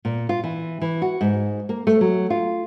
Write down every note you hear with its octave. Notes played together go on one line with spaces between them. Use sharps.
A#2
F4
E3
E3
F#4
G#2
A#3
A3
F#3
F4